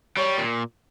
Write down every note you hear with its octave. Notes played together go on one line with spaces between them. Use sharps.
G3 C#5
A#2